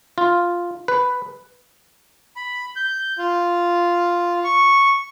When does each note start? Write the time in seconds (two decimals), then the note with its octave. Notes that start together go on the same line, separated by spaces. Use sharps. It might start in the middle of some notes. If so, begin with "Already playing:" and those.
0.18 F4
0.88 B4
2.36 B5
2.76 G6
3.18 F4
4.44 C#6